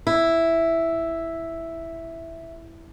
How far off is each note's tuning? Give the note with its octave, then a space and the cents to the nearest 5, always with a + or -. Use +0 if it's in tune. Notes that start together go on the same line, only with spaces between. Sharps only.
E4 +0